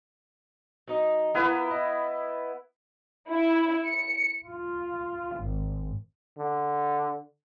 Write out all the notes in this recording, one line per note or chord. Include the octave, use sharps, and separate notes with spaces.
F#3 D#4 D#5
B3 E4 F4 A#4 B4
D#5
E4
C#7
F4
G#1
D3